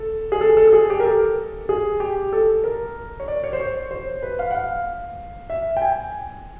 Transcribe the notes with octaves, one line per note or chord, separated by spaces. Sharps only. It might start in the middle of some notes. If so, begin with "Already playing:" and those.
Already playing: A4
G#4
A4
A4
A4
G#4
G4
A#4
A4
G#4
G4
A4
A#4
C#5
D5
C#5
C5
C#5
C5
B4
F5
F#5
F5
E5
G5
G#5